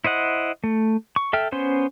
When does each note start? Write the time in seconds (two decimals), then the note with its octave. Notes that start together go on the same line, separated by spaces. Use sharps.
0.04 E4 C5 D#5 F#5
0.64 A3
1.16 C#6
1.33 A4 E5 G5 F6
1.52 B3 C#4 C5 C6